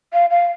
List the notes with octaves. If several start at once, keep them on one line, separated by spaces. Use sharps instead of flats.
F5
F5